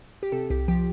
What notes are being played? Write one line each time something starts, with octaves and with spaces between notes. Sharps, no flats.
G4
C3 A4
C2 G4
F3 G4